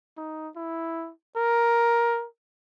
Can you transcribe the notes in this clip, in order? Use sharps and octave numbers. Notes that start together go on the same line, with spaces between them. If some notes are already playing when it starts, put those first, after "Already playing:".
D#4
E4
A#4